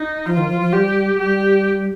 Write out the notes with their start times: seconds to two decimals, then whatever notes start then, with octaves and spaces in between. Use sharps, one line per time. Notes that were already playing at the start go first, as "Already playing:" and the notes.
Already playing: D#4
0.26 F3 F4
0.37 D#3
0.49 F3
0.61 F3
0.73 G3 G4
1.19 G3 G4